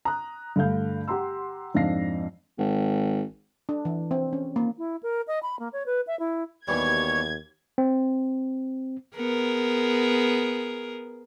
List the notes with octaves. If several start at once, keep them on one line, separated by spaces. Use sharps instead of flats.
A#5 D#6 F#6
G2 D3 A3 F5 G6
G4 F#5 A#5 C6 E6
F2 G#2 D4 F5 A#6 C7
G#1
D4
E3
C4
C#4
A#3
E4
A#4
D#5
B5
A#3
C#5
B4
E5
E4
D#2 B2 E3 G3 C#5 G#6
C4
B3 G#4 A#4